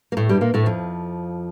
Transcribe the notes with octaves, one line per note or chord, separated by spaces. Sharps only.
A#3
A2 A3
G2 G3
A#2 A#3
A2 A3
F2 F3